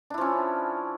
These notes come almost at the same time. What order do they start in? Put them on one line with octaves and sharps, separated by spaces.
D4 E4 F3 C#4